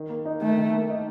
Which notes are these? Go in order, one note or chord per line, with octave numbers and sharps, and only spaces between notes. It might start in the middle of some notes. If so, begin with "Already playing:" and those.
Already playing: D#3
A#3
D#4
D#3 A3
D#3
A#3
D#4